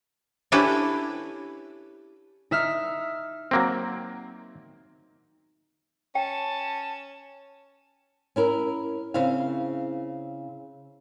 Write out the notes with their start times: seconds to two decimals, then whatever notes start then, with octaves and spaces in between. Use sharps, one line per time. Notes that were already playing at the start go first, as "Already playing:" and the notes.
0.52 C#4 D4 E4 G4 A4 B4
2.51 D#4 E5 F6
3.51 F#3 A#3 C4
6.15 C#4 G5 A5
8.36 C#4 E4 A#4
9.14 C#3 C4 E4 C5 F5